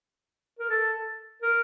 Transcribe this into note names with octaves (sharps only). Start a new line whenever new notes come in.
A#4
A4
A#4